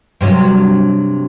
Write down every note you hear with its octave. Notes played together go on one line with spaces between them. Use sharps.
G2 C3 F#3